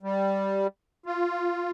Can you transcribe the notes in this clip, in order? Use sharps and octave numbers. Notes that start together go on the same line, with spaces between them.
G3
F4